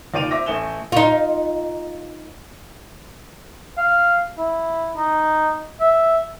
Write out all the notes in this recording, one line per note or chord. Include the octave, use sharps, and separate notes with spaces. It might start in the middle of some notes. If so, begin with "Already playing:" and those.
D#2 F4 D5 D7 D#7 F7
C5 E5 D6 A#6
A1 A3 G#5 E7 G7
D#4 F4
F5
E4
D#4
E5